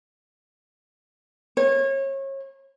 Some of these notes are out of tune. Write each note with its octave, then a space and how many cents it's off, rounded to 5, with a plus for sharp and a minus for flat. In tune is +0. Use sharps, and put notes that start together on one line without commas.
C#5 -30